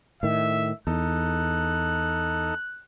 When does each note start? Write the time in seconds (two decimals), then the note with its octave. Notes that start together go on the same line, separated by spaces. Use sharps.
0.23 A2 D#3 E5
0.87 E2 D#4 A4 F#6